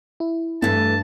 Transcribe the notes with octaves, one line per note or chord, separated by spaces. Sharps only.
E4
E2 G2 E3 A3 A5